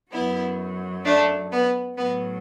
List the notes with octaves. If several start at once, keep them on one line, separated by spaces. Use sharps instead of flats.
F#2 F#3 B3 E4
A3 D4
B3
A2 F#3 B3